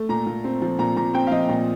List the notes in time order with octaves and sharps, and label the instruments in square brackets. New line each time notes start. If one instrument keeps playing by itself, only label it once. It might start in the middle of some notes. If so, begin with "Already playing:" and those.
Already playing: [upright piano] A3
A#2 A#5
A#2
C4
F3
A#2 A#5
A#2 A#5
C4 G5
F5
F3 D#5
A#2